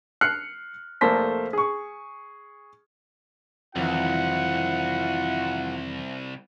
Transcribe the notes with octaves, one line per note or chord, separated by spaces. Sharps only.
F6 F#6 C7 C#7
F1 A3 A#3 A4 C5 B6
G#4 C#6
C2 F2 D#3 E3 E4 F4 F#5